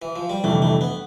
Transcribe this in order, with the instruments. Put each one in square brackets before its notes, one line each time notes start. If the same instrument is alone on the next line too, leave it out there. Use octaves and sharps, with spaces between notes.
[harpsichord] E3
F3
G3
[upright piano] G1 F2 C3 E3 [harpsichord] A3
[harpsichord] A3
B3